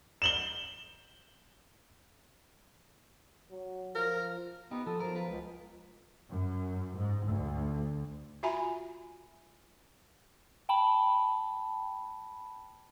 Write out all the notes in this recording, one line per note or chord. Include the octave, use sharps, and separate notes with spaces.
E7 F#7 G7
F#3
F3 A#4
B3 D#4 G4
F3 A4
F3 F#3 A#4
F4 B4 F5
C#2
F#2
G#2
D2
F4 F#4 E5 G#5 A#5 B5
G5 A5 B5